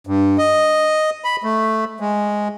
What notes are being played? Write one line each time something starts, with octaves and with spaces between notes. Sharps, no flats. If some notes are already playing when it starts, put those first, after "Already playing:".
G2
D#5
B5
A3
G#3